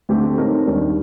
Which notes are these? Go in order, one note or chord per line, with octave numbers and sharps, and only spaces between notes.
D2 D3 A3 C4 G4
A2 A3 C4 D#4 A#4
D#2 D#3 G3 D4